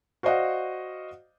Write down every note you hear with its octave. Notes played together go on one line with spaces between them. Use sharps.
F#4 C5 D5 D#5 F5 F#5